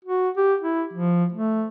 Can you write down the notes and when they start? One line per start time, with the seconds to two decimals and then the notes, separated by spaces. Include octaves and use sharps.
0.05 F#4
0.37 G4
0.61 E4
0.93 F3
1.33 A3